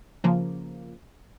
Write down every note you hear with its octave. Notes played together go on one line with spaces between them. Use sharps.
C#3 F3 A#3